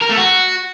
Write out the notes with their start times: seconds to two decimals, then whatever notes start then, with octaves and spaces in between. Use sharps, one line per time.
0.01 A#4
0.09 A3
0.17 F#4